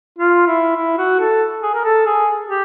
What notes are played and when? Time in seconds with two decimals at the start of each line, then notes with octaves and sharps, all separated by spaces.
0.19 F4
0.47 E4
0.76 E4
0.98 F#4
1.20 A4
1.62 G#4
1.74 A#4
1.84 A4
2.06 G#4
2.48 G4